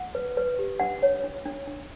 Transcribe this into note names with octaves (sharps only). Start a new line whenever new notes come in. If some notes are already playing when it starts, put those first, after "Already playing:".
Already playing: F#5
B4
B4
G4
D4 F#5
C#5
D4
D4
D4